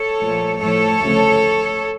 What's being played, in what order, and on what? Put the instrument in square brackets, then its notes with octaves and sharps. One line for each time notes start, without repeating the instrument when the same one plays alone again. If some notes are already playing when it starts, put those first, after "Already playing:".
Already playing: [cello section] A4 C#5
A#2 F3 A3
A2 F3 A3 A4 C#5
D2 C#3 F3 A3